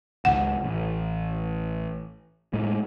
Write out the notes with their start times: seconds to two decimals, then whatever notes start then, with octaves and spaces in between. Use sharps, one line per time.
0.25 G#1 C#2 F#5
0.64 A1
2.53 A2 G#3